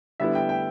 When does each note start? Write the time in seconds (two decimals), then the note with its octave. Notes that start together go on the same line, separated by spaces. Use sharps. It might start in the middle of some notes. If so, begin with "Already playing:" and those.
0.20 D3 G3 B3 E4 E5
0.35 G5
0.49 G5